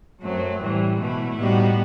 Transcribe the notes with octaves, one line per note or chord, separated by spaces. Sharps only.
F#2 F#3 A3 C4
A2 E3 G3
B2 A3 E4
A2 G3 B3 D#4 F#4